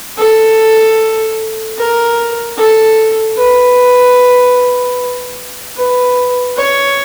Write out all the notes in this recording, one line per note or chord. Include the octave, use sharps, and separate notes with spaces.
A4
A#4
A4
B4
B4
C#5